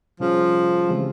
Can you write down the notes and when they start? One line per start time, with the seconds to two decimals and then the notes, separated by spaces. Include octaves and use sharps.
0.20 C3 F3 G3 C#4 F4 G#4
0.89 C#3 E3 G#3 C4 G4